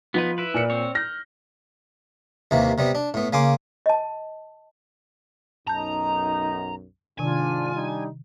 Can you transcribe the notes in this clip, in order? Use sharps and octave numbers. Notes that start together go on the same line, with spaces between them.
F3 B3 D#4 B4
E4 B4
A#2 C#7
C4 C#5
F6 G6 A#6
D#2 C3 E3 A#3
C3 G3 B3
D4
A2 B3
C#3 A#3 G#5 C6 D6
D#5 A5
B1 F#2 D#4 A5 A#5 G6
G#2 C3 D#3 D4 F4 G#5
G3 D4 D#4